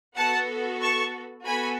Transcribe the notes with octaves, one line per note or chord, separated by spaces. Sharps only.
B3 F#4 A4 F#5 A5
A5 C#6
B3 F#4 A4 G#5 B5